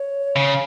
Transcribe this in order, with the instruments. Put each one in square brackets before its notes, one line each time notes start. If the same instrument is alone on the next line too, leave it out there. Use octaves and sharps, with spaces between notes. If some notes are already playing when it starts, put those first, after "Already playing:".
Already playing: [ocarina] C#5
[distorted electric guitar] C#3